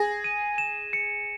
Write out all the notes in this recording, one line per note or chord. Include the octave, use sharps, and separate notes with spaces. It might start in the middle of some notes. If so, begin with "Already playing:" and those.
Already playing: G#4 A#6
D#7
E7
C#7